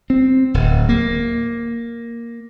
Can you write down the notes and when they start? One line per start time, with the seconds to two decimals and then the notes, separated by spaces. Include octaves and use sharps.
0.10 C4
0.54 D1
0.89 A#3